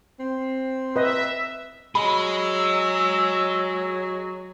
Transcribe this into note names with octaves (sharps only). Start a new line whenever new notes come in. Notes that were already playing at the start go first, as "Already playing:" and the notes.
C4
B4 D#5 E5
F#3 G#4 D#5 B5 E6